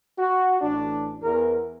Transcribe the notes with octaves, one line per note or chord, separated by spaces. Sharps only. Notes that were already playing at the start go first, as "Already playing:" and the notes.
F#4
A1 D4
E2 A#4